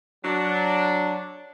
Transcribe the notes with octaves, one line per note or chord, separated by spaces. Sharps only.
F#3 D4